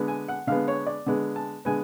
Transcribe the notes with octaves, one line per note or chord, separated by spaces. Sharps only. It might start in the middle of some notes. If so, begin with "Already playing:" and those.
Already playing: D3 G#3 B3
G#5
F#5
D3 G#3 B3 F5
C#5
D5
D3 G#3 B3
A5
D3 G#3 B3 G#5